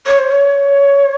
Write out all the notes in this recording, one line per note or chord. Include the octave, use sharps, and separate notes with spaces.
C#5
C5
C#5